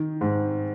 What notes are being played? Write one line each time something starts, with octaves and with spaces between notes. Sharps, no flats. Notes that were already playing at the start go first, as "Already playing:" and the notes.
Already playing: D#3
G#2